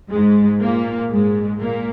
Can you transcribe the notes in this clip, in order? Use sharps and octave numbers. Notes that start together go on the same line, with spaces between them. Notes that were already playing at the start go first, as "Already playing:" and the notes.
G#2 G#3
A#2 A#3
G#2 G#3
A#2 A#3